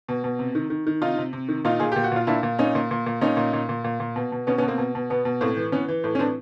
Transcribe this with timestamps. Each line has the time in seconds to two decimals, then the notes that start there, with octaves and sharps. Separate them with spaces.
0.09 B2
0.24 B2
0.39 C3
0.55 D#3
0.70 D#3
0.87 D#3
1.01 C3 D#4 F4
1.18 C3
1.33 C3
1.49 D#3
1.65 A#2 D#4 F4
1.80 A#2 G#4
1.92 A#2 G4
2.04 F#4
2.12 A#2 F4
2.27 A#2 D4 E4
2.43 A#2
2.59 A#2 C#4 D#4
2.75 A#2
2.91 A#2
3.06 A#2
3.21 A#2 C#4 D#4
3.37 A#2
3.53 A#2
3.69 A#2
3.84 A#2
4.00 A#2
4.16 B2
4.32 B2
4.47 B2 B3 C#4
4.58 B3 C#4
4.63 B2
4.68 A#3 C4
4.78 B2
4.95 B2
5.10 B2 B3
5.25 B2
5.41 A2 A#3 C4
5.57 E3
5.72 E3 B3 C#4
5.88 E3
6.04 A2
6.15 C#4
6.19 E3 C4 D4